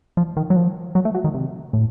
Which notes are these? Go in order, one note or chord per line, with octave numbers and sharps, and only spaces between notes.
F3
D#3
F#3
F3
F#3
A3
F#3
D#3
C3
A2